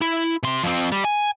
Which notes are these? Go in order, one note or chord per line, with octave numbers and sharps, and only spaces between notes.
E4
C3 C6
F2 C4
G3
G#5